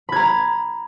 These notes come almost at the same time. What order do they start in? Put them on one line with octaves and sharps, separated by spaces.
B5 G#6 A#5